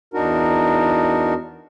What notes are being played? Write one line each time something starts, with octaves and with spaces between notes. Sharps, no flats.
E2 D4 D#4 F#4 A#4